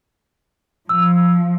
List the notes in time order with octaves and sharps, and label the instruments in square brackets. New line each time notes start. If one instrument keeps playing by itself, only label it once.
[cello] F3 [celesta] E6